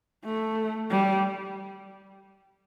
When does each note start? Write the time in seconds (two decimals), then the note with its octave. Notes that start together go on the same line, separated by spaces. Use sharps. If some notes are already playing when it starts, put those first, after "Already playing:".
0.25 A3
0.90 G3